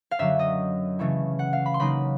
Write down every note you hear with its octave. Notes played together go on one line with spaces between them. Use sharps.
F5
F#2 D3 F#3 E5
D#5
C#3 E3 A3 C#4 E4
F#5
F5
B5
C6
C#3 F#3 A#3 D#4 B5